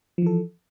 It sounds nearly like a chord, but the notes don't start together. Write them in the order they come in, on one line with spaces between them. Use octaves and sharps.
F3 E3 A4